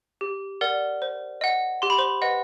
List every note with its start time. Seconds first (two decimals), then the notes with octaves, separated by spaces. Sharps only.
0.21 G4
0.61 A#4 D5 F#5
1.02 C5
1.41 D#5 F#5
1.82 G4 C6
1.90 B5
1.98 C5 C6
2.22 B4 D#5 F#5